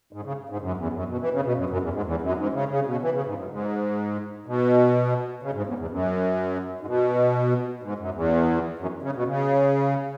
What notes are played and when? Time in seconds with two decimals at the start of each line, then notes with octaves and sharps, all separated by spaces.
0.13 G#2
0.24 C#3
0.49 G#2
0.61 F#2
0.77 E2
0.93 F#2
1.09 B2
1.21 E3
1.32 C#3
1.45 B2
1.56 F#2
1.70 F#2
1.81 E2
1.93 G#2
2.05 E2
2.22 F#2
2.37 G#2
2.53 C#3
2.69 C#3
2.86 B2
3.02 E3
3.13 C#3
3.26 G#2
3.37 F#2
3.50 G#2
4.46 B2
5.43 C#3
5.54 G#2
5.67 E2
5.78 E2
5.90 F#2
6.80 G#2
6.86 B2
7.83 G#2
7.99 F#2
8.14 E2
8.79 F#2
9.02 C#3
9.15 B2
9.27 C#3